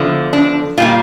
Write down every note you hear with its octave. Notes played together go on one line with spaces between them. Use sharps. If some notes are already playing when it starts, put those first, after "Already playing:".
Already playing: E2 D3 F3
D4
A#2 G3 A#3 F4